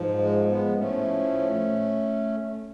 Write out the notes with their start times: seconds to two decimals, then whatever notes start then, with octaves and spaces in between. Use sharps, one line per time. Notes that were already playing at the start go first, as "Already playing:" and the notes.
Already playing: G#2 F3
0.18 G#3
0.48 G#3 B3
0.77 A2 F3 A3 C#4